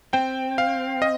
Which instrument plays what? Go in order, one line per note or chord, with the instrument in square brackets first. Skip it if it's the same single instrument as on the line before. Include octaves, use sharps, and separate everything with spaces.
[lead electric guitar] C4 [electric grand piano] G5
[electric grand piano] F5
D#5